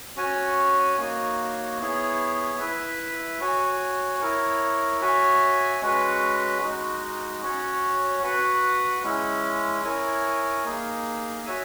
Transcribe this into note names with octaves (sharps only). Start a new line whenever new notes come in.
C#4 F#4 C#5 G#5
A#3 D#4 F#4 C#5
B3 E4 G#4 C#5
E4 B4 E5
F#4 C#5 G#5
E4 A#4 C#5
F#4 C#5 E5 G#5
G#3 C#4 F#4 B4
G#3 D#4 F#4
C#4 F#4 C#5
F#4 B4 F#5
G#3 C#4 E4
E4 A#4 C#5 G#5
A#3 D#4 G#4
F#4 C#5 E5 G#5